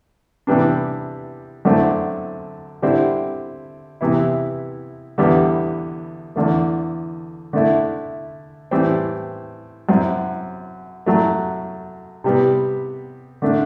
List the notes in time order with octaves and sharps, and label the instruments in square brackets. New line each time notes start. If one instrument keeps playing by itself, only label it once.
[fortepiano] C3 E3 G3 B3 D4
F#2 D3 A3 C4
D3 G3 C4 E4
C3 E3 B3 E4
E2 D3 G3 B3 E4
E2 D3 A3
D3 A3 E4
A2 E3 G3 C4
F#2 F#3 C4 E4
F#2 F#3 A3
C3 G3 B3
D3 A3 D4